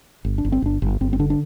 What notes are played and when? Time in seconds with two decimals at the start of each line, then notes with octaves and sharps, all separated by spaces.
0.25 G1
0.38 D4
0.45 G1
0.52 C4
0.62 G1 D4
0.82 G1
1.01 G1 C4
1.13 C4
1.19 D3 D4
1.30 D4